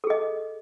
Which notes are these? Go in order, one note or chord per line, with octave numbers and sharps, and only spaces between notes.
G#4 A4 D#5